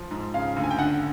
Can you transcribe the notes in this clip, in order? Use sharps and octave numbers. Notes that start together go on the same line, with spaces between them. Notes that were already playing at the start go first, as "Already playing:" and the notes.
Already playing: F3
G#2
C#3 F5
D2
G#5
G5
D3 F#5